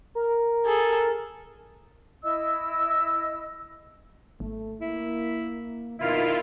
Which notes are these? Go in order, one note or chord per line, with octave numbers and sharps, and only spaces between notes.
A#4
G#4 A4
E4 D#5 E6
G#1 A3
A#3 E4
F2 B2 D#3 E4 F4 F6